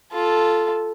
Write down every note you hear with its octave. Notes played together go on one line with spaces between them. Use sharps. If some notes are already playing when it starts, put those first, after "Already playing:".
F4 A4